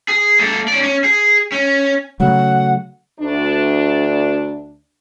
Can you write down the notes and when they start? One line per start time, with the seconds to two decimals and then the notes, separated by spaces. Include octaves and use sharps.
0.08 G#4
0.40 A#3 A4
0.68 C#4 D5
0.83 C#4
1.04 G#4
1.52 C#4
2.20 C#3 F#3 A3 F#5
3.20 D2 D4